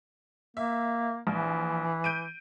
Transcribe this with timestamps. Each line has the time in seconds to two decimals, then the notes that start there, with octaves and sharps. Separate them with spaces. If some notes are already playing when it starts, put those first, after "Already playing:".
0.57 A#3 E5
1.27 A#1 E3
2.04 G6 D7 D#7